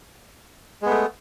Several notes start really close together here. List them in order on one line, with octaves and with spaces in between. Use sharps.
G#3 B3 A3